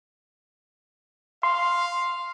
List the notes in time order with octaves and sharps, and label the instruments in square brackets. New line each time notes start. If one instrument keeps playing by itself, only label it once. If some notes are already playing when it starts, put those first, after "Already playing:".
[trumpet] F5 [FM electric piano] C6